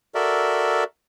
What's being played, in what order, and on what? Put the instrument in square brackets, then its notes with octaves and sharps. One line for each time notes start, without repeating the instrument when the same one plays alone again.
[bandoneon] F#4 A4 A#4 D5 E5